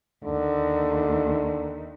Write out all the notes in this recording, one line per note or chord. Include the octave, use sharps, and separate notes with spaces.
D#2 D3